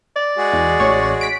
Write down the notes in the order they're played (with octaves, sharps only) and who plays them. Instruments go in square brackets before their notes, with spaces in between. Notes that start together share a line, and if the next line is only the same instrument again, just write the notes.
[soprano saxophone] D5
[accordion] G#3 F#4 G#4
[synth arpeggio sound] E2
A1 C#5 C#6
B6 D7